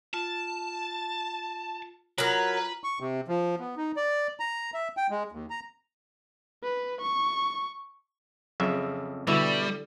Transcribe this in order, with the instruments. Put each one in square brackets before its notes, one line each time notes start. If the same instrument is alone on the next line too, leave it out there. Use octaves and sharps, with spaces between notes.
[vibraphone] F4 [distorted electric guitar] A5
[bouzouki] F#3 A#4 [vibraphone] F4 A#5 [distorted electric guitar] B4
[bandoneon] C#6
C3
F3
B3
D#4
D5
A#5
E5
G5
G#3
D#2
A#5
[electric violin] B4
C#6
[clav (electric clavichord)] F2 C#3 E5 [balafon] F#3 G#4
[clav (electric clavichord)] B2 E5 [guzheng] D3 [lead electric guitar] G3 [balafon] E4